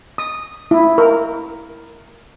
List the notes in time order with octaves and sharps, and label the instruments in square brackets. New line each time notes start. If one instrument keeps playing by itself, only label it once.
[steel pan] D#6
E4
A#4